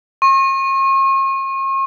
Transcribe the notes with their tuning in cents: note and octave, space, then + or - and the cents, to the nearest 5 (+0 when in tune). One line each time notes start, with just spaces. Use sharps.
C#6 -45